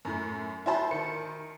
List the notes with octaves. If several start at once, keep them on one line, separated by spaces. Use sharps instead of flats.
F#2 A2
E4 F#4 C5 A5 B5 C6
D#3 C#7